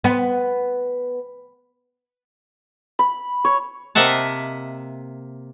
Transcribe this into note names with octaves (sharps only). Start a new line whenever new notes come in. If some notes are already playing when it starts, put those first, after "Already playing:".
B3
B5
C#5
C3 A#3 D#5 E5 F#5 A5